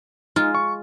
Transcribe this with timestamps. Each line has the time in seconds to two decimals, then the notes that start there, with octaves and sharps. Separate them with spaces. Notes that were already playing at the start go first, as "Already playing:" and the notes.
0.36 G#3 D#4 F4
0.55 C#6